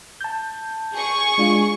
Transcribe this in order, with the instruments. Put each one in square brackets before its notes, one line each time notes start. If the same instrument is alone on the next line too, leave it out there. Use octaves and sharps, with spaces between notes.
[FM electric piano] A5 G6
[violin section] G#4 C#6
[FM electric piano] G#3 D4 F4